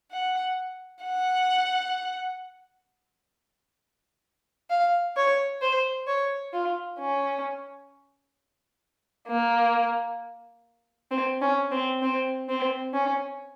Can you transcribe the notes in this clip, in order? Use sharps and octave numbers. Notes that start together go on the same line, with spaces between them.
F#5
F#5
F5
C#5
C5
C#5
F4
C#4
A#3
C4
C#4
C4
C4
C4
C#4